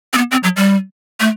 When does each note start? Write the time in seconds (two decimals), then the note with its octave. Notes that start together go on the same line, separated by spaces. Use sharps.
0.14 C4
0.18 B3
0.31 C4
0.43 F#3
0.56 G3
1.20 A3